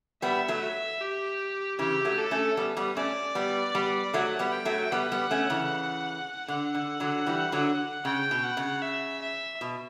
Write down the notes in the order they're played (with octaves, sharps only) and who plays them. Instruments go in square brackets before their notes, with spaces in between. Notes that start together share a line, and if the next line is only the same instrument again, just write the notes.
[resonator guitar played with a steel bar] G3 B3 [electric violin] E5
[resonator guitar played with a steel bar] F#3 A3
[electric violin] E5
G4
[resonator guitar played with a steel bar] C#3 E3 [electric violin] G4
[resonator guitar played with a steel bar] F#3 A3
[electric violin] A4
[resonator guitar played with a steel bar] A3 C#4
G3 B3
G3 B3
[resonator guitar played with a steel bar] A3 C#4 [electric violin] D5
[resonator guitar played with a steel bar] G3 B3
G3 B3
[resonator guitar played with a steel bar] F#3 A3 [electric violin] F#5
[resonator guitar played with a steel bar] G3 B3
[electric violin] G5
[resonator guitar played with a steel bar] F#3 A3
[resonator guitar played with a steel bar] G3 B3 [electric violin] F#5
[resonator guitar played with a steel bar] G3 B3
A3 C#4
C#3 E3
[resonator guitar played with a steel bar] D3 [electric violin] F#5
[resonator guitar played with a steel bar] D3
D3 F#3
E3 G3
D3 F#3
[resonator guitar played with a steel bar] C#3 [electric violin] G5
[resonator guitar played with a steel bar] B2
[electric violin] F#5
[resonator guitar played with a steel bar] C#3
[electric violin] E5
E5
[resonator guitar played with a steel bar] B2